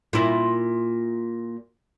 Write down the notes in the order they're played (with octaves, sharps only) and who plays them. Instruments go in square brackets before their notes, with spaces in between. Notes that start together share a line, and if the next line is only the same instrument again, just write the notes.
[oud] A#2 E4